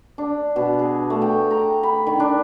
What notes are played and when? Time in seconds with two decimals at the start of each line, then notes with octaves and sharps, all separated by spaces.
0.18 D4
0.56 B2
0.79 G#4
1.10 A3
1.22 G5
1.51 A#5
1.83 B5
2.07 D#3
2.20 D4